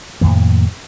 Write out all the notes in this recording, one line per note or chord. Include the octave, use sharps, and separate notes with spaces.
F2 A2 D#3 A#3